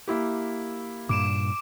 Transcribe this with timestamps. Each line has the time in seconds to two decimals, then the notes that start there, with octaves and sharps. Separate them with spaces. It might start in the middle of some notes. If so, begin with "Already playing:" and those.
0.08 A#3 E4 G4
1.09 G2 A#2 D6 D7 E7